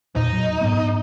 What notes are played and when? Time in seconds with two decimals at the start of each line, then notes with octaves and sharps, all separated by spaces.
0.16 E2 A#2 D#4
0.33 F#3
0.61 G#2 B3